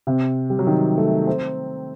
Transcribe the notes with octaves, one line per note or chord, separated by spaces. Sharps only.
C3
G3
F#3
D#3
A3
C4